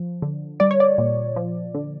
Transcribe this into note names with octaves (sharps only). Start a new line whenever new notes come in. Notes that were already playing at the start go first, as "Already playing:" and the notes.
Already playing: F3
D3
G3 D5
C#5
D5
A#2
F3
D3